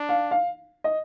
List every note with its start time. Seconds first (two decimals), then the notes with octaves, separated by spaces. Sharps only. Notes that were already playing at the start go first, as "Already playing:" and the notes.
Already playing: D4
0.09 F5
0.31 F5
0.84 D#5